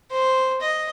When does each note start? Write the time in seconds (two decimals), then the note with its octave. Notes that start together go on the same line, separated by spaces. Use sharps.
0.11 C5
0.61 D#5